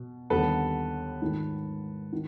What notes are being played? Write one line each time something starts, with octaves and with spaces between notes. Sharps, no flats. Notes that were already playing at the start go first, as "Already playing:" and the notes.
Already playing: B2
D#2 D3 G3 B3 A4 B4
G#2 D#3 G#3
D#3